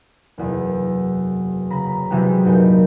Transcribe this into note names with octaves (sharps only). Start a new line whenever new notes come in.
F#1 E2 C3
C#3 A#5 B5
C3 E3 F#3 G#3 B3 G4
F#1 A#2 D#4 B4 G5